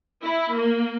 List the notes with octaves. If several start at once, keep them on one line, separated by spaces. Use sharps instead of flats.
E4
A#3